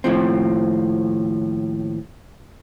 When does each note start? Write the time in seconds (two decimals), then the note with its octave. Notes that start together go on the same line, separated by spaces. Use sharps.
0.04 D#2 A2 F3 C4